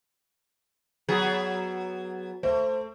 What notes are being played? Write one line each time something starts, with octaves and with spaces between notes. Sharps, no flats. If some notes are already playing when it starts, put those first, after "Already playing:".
F#3 B3 G#4
A3 C5